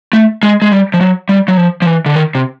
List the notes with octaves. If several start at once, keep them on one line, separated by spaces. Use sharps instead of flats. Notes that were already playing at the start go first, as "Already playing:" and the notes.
A3
G#3
G#3
G3
F3
F#3
G3
F#3
F3
F3
E3
D3
D#3
C3